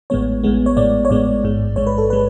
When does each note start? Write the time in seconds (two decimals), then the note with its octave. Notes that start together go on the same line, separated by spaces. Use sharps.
0.10 A1 A2 G#3 B3 C#5
0.44 A1 A2 G#3 B3
0.66 C#5
0.77 A1 A2 G#3 B3 D5
1.05 C#5
1.09 A1 A2 G#3 B3 D5
1.43 A1 G#2 G#3
1.76 A1 G#2 G#3 C#5
1.87 B4
1.98 A4
2.10 G#3 B4